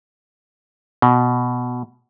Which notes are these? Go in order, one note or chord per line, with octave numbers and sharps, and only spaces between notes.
B2